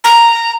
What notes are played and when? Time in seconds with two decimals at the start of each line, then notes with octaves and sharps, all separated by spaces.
0.04 A#5